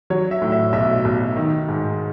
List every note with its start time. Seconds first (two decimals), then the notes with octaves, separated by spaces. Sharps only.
0.10 F#3 C#5
0.31 E5
0.42 A2
0.52 E5
0.73 B1 E5
1.05 B1
1.36 D#3
1.69 G#2